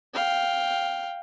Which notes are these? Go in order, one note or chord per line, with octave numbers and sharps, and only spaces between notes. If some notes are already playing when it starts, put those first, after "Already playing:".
F5 G5